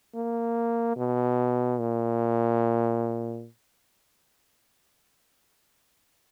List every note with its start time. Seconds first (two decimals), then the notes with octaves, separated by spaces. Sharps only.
0.15 A#3
0.96 B2
1.80 A#2